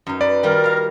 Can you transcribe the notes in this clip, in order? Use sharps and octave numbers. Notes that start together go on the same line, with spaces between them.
F#2 D#4
B4 D5
D#3 G3 F4 A#4
F5 A#5